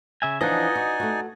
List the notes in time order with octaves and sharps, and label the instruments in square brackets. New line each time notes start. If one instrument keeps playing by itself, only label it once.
[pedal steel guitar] C#3 E5 G#5
[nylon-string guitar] E3 F3 D4 [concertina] D#4 D5 G#5 [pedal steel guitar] D#5 F#5
[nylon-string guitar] F#4
A3 F#4